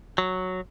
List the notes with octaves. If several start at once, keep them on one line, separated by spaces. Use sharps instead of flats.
F#3